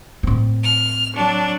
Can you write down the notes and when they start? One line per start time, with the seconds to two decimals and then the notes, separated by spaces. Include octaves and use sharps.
0.23 A2 C4
0.63 F6
1.13 F#3 D4